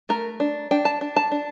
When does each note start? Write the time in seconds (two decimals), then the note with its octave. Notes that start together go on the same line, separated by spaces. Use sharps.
0.09 A3 A#4
0.40 D4
0.71 D4 G5
0.85 A5
1.01 D4
1.16 A5
1.32 D4